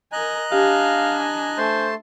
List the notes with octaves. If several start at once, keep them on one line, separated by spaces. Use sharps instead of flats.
A#4 D#5 G#5 A#5 F#6
D4 G4 F5 G#5
A3 C5 A5 C6